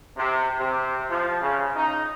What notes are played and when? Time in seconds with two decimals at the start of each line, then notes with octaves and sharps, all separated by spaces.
0.17 C3
0.59 C3
1.09 F3
1.41 C#3
1.76 D#4